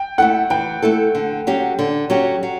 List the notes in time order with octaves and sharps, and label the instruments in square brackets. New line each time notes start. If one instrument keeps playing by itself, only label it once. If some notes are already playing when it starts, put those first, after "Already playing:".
Already playing: [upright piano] G5
[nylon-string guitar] A3 E4 A4 [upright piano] F#5
[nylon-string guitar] E3 [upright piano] G5
[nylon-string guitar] A3 E4 A4
D3
F#3 C#4 G4
D3
F#3 C#4 G4
F#3